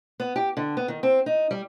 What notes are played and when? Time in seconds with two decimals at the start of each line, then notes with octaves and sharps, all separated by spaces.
0.20 B3
0.36 G4
0.57 D3
0.77 B3
0.88 D#3
1.03 C4
1.26 D#4
1.51 G3